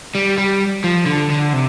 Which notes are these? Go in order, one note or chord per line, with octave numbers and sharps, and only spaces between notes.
G3
G3
F3
D3
D3
C3